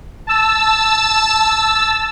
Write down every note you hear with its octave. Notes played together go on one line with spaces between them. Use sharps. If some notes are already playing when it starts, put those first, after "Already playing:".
A5 E6